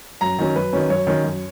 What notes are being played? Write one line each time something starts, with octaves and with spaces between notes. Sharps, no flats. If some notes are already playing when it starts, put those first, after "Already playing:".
F#2 A#5
D#3 F#3 C#4
F#2 B4
D#3 F#3 C#4
F#2 C#5
D#3 F#3 C#4
F#2